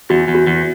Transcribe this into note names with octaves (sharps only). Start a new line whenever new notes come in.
E2 F#4
E2
F#4
E2